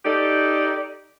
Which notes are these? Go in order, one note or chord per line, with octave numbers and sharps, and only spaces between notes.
D#4 G4 A4 D5